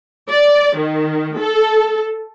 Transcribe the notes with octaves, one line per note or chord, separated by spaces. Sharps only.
D5
D#3
A4